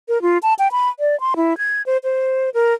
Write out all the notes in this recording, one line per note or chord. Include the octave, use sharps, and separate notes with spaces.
A#4
F4
A5
G5
B5
D5
C6
E4
G#6
C5
C5
A#4